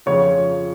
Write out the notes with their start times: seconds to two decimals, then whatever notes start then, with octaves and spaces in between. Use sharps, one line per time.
0.06 F2 C#3 F3 C#5